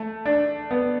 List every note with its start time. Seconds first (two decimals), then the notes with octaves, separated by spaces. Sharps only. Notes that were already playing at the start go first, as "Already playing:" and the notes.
Already playing: A3
0.25 D4
0.71 B3